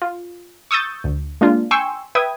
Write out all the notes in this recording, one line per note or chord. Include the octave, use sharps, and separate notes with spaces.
F4
C#6 D#6 E6 G6 A6
D2
G#3 A#3 D4 F4
G5 G#5 C6 C#6 E6
B4 E5 G5 D#6 G#6